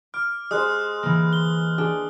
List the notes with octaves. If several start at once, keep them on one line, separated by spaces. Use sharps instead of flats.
D6 F6
G#3 C5 D#6 F#6
E3 A#3
G7
D4 G#4 G7